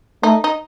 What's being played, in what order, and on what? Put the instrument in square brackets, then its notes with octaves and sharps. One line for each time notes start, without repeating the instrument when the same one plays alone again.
[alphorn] A3 [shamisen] D#4
[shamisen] D#4